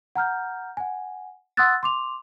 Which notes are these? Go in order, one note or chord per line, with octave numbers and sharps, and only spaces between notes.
F#5 A#5 F6 G6
F#5 G#5
F#5 C6 D#6 E6 F#6 A6
C6 D6 F7